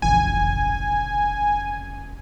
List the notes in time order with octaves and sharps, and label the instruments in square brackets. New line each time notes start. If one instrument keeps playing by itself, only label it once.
[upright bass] F1 C#3 [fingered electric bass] A#1 E3 [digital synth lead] G#5